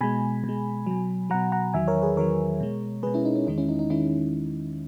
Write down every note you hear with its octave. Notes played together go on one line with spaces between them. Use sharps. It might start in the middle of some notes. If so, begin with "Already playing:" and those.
B2 G#3 G#5 B5
B2
G#3
B2 F#3
B2 F#3 F#5 A#5
F#5 A#5
E2 D#3 F#3 E5 G#5
A#4 C#5
G#4 B4
E2 D#3 F#3 A#4 C#5
B2 G#3
B2 G#3 G#4 B4
C#4 E4
D#4
C#4
E2 D#3 G#3 D#4
C#4 E4
D#4
D#4
D#3 G#3 C#4 E4